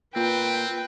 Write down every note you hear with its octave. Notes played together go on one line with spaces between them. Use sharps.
A#2 C4 B4 G5